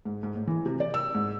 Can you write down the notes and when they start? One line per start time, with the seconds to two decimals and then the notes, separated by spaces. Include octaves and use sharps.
0.05 G#2
0.23 G#2
0.35 A2
0.47 E3
0.66 C3
0.80 D5
0.94 E6
1.15 G#2